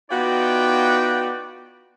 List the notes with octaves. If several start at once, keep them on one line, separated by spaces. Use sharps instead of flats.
B3 D#4 F4 F#4 D5 G5